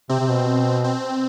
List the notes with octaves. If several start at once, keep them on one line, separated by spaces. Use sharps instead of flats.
C3 C4
C3
B2
C4